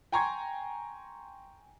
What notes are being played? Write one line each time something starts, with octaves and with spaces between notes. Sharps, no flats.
G5 G#5 A#5 C6 C#6 G#6